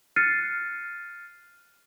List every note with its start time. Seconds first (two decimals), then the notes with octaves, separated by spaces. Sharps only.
0.16 F6 F#6 A6 C7 C#7 D#7